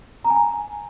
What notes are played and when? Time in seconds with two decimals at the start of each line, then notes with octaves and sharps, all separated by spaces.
0.24 A#5
0.30 G#5
0.36 A#5